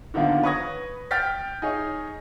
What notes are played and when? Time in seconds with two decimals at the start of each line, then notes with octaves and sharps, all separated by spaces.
0.14 D3 D#3 F3 A#3 B3
0.43 B4 C#5 C#6 D#6 G#6 A#6
1.11 G5 F6 G6 A6 B6
1.62 D#4 G#4 C#5